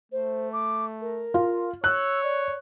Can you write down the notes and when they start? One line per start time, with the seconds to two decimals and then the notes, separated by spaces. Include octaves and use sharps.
0.12 A3 C5
0.53 D6
1.01 A#4
1.34 F4
1.84 C#5 E6 F#6
2.23 D5